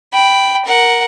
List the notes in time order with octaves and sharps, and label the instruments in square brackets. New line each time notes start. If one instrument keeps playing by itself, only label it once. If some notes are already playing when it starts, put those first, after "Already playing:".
[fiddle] G5 B5
A#4 F#5